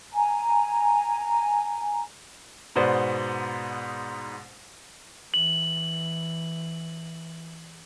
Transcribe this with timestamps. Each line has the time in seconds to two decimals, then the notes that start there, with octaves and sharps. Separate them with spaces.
0.14 G#5 A#5
2.76 G#2 B2 B3 C5 D5
5.34 E3 F#7